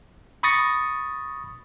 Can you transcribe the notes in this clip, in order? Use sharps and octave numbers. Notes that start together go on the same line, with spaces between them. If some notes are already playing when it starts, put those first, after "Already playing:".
B5 C#6 D#6 A6 A#6 C#7